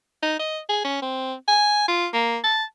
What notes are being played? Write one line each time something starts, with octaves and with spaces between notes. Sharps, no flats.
D#4
D#5
G#4
C#4
C4
G#5
F4
A#3
A5